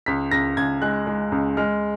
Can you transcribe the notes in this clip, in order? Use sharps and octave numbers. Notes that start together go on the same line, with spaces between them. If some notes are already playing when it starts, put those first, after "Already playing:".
C#2 B6
C#2 A#6
C#2 G#6
G#3 F#6
G#3
C#2
G#3 F6